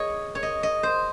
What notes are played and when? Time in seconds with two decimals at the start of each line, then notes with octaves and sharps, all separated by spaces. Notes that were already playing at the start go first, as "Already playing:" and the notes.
Already playing: G#4 C#5 D#5
0.35 C#5
0.43 D#5
0.63 D#5
0.83 C5